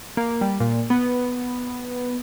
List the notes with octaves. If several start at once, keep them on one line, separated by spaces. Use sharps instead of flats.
A#3
G3
A#2
B3